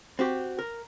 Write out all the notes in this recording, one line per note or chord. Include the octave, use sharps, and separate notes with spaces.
C4 F#4 G4
A#4